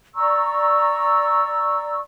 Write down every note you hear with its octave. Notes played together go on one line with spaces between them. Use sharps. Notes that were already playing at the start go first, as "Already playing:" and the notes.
D5 A#5 C#6 E6